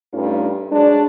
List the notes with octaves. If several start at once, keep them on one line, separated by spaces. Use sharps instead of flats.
G2 A3 C#4 D#4 F4
F#3 G#3 D4